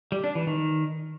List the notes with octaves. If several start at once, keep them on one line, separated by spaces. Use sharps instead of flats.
G3
D4
E3
D#3